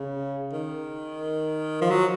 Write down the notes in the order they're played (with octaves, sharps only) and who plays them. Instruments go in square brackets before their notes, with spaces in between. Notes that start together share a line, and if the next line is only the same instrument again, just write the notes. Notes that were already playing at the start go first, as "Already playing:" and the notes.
Already playing: [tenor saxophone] C#3
D#3
F3
F#3